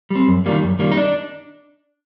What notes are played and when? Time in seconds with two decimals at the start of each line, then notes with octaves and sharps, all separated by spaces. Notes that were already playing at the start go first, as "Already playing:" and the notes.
0.10 G3 C4
0.28 F#2
0.46 D#3 G3 A#3
0.63 F#2
0.79 D#3 G3 A#3
0.92 D#4
0.97 D4